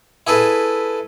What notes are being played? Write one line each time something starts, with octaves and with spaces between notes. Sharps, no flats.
E4 G#4 A4 B4